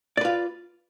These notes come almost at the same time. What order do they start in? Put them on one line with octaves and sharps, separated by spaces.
D5 B4 F4